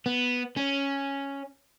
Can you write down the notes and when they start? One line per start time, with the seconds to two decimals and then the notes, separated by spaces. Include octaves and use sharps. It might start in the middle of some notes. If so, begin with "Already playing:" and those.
0.06 B3
0.57 C#4